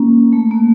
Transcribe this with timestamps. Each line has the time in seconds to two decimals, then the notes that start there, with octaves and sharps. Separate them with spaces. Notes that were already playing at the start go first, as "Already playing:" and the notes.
Already playing: A#3 C#4
0.33 A3
0.51 A#3